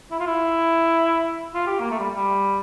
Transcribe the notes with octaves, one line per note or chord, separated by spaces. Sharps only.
E4
F4
E4
F4
G4
A#3
A3
G3
G3